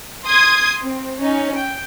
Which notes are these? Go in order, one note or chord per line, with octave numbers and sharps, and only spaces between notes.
C6 D#6 G#6
C4
C#4 D#4
G5